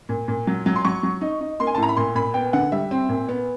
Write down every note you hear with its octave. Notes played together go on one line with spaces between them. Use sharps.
A#2
A#2
F#3
F#3
C6
F#3 C#6
F#3
D#4
D#4
A#3 C6
G#5
A5
A2
A#5
B5
A#2 C6
A#2 B5
B3 G5
D3 F#5
G3 E5
C4
A#2
B3